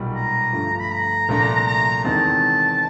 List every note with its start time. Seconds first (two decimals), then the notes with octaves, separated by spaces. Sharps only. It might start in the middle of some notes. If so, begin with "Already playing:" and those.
Already playing: B1 A#2 G3
0.15 A#5
0.53 G2 D3 F3 A3
0.80 B5
0.91 A#5
1.29 C2 A#2 F3 A3 D4
1.67 A#5
2.04 E2 C3 D#3 G#3 C4 A5